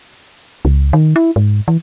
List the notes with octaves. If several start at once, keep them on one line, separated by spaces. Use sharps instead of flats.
C#2
D#3
E4
G#2
E3